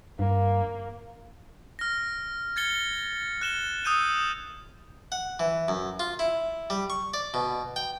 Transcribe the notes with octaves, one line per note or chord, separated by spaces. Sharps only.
G2 A#3
F6 A#6
G#6 A6 C#7 G7
F#6 E7 G7
D#6 E6 G6 D#7 E7
F#5
E3
F#2
F4
E4
G3
C#6
D5
B2
G5